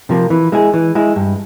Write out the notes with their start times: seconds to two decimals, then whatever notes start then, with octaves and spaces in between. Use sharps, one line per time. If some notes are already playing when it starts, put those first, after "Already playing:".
0.09 C3 F3 A#3
0.30 E3
0.52 G#3 E4 G#4
0.74 E3
0.95 G#3 E4 G#4
1.16 G2